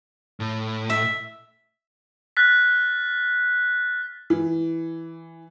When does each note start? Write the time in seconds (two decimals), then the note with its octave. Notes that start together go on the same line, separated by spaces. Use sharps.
0.40 A2
0.90 E5
2.37 F6 F#6 A6 B6
4.30 E3